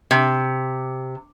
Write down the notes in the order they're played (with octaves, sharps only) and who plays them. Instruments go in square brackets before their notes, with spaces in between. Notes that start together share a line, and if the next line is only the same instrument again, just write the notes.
[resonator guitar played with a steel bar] C3